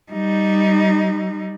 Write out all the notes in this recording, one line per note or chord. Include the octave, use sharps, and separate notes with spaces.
G3 D#4